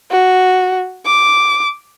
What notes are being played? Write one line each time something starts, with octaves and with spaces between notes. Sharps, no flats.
F#4
D6